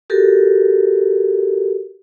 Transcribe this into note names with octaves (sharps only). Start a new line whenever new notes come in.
F#4 G4 A4 A#4